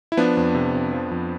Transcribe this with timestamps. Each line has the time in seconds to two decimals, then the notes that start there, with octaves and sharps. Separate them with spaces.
0.12 E4
0.17 F3 B3 D4
0.37 F2
0.55 C3
0.74 F2
0.93 F3
1.11 F2